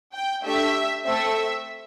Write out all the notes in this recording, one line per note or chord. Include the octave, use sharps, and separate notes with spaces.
G5
A3 D4 G4 E5
A3 C4 A4 E5